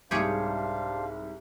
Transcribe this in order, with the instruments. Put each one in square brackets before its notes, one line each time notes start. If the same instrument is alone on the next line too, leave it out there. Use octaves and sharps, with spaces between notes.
[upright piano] C2 G#2 [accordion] D4 C5 F5 [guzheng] G4 G#4 C#5